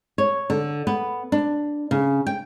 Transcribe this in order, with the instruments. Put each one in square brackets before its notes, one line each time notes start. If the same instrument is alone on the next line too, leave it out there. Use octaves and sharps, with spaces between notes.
[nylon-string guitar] C#5
D3
B3
D4
C#3
G5